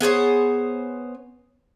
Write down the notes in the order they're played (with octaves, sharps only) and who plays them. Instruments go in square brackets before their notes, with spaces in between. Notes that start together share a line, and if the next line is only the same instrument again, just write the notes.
[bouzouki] B3 G#4 C5 C#5